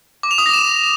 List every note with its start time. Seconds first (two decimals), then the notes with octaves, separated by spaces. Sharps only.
0.23 D6
0.31 F7
0.38 D#6
0.46 A#6
0.53 E7